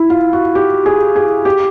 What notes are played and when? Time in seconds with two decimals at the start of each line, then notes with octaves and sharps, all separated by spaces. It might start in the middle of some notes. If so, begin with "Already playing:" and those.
Already playing: E4
0.10 F4
0.33 F#4
0.55 G4
0.86 G#4
1.16 G#4
1.45 G4